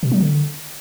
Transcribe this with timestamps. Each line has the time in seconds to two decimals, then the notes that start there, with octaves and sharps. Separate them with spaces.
0.03 B2
0.12 F#3
0.20 D3